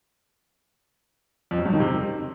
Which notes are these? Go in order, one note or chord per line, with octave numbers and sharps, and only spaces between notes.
F2
F#2
G2
D#3
C3